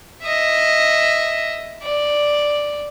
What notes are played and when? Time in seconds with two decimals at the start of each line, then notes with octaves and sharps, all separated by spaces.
0.24 D#5 E5
1.83 D5